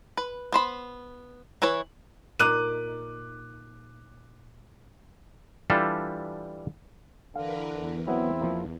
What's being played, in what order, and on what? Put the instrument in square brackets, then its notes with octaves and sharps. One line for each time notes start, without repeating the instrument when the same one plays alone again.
[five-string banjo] B4
B3 C5 B5
E3 E4 B4 C#5
[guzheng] A#2 D#4 [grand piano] D6 F#6 D#7
[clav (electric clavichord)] E3 G3 D4 F4 G4 A4
[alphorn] D3 [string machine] E3 A#4 B4 [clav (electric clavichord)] F5
[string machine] E2
[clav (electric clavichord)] F#3 B3 [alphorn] C4 [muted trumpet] E4
[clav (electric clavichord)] F3 A#3